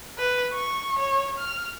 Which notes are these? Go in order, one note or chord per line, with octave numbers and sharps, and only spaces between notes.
B4
C#6
C#5
F6